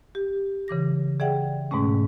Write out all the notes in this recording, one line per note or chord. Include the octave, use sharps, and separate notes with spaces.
G4
C#3 E3 D6 A#6
G#4 D5 E5 F#5 G5
G#2 B2 G#3 A3 C#4